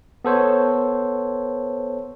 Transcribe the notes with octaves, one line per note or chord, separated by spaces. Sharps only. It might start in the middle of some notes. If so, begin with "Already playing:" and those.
B3 A4 C5 C#5